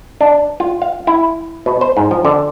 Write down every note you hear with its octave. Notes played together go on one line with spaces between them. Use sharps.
D4
F4
F5
E4
B2
C5
G#2
F3
D3